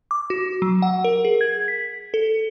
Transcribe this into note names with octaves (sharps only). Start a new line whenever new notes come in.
D6
F#4
F#3
F#5
A#4
G#4
G#6
B6
A4